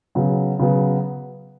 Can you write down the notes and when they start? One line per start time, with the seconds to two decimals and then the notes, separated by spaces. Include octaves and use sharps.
0.15 C#3 F#3 B3
0.59 C#3 F#3 B3